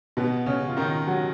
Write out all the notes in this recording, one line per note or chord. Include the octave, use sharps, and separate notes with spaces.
B2 B3
C#3 C#4
F4
D#3 D#4
F#3 F#4